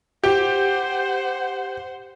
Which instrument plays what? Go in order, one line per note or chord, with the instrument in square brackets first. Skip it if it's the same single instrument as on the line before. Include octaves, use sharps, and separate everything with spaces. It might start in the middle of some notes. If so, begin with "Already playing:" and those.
[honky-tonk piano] G4 [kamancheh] C5 F#5